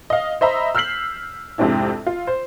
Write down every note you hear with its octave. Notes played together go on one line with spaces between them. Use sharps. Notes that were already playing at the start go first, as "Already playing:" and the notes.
D#5 F5
C5 D#5 E5 A#5 B5
E6 F6 G6 B6 C7 F#7
F2 G#2 C3 C4 D4 E4
F4
C5